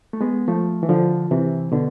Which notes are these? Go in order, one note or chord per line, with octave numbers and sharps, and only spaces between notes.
A3
G#3 B3
F3 A3
E3
D3 F3
C3 E3
B2 D3